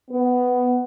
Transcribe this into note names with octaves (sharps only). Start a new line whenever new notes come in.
B3